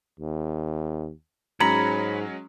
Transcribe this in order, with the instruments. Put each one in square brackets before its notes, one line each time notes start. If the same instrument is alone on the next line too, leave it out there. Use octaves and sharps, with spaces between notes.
[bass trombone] D#2
[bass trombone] G#2 [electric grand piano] F#3 G#3 C#4 [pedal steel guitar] C#5 B5 [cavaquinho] A#5